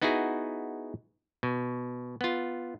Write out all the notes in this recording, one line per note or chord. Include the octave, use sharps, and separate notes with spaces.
B3 D#4 E4 F#4 G#4
B2
B3 F4